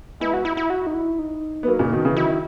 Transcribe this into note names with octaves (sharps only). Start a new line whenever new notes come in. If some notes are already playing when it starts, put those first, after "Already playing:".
G#3 B3 E4
F#4
E4
E4
F#4
D#4
E4
D#4
B3
F#3 A#3
A#2 C#3
B2 D#3
C#3 E3
D#3 F#3 E4